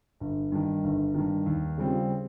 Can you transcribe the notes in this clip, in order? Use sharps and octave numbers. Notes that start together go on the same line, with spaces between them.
G1
G2 D#3
G1
G2 D#3
D#2
C#3 G3 C4 F4